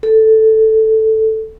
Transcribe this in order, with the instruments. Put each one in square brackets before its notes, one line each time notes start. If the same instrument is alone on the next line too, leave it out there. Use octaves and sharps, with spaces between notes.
[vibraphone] A4